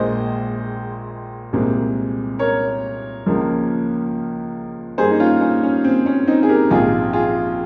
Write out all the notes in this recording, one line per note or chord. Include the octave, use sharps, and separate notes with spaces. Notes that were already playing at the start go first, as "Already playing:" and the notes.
Already playing: A#1 A#2 G#3 C5 D#5
C2 A#2 G#3 C4
A#4 C#5
C#2 C#3 F3 A#3
G2 G3 A#3 G#4 C5
D#4
C#4 F4
C#4
C#4
C4
C#4
C4 D#4
G#4
G4 A#4
A#1 G#2 F3 C4 F4 G#4
F4 G#4